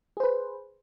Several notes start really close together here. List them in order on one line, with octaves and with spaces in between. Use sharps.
G#4 C5 B4